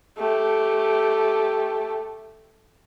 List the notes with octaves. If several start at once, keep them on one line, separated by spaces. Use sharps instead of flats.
A3 G4